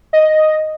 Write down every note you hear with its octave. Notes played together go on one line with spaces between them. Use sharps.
D#5